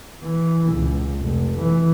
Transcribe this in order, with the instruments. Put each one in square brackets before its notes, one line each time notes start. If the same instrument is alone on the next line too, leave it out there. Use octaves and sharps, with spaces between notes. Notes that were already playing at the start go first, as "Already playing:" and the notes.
[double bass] E3
C#2
F1
E3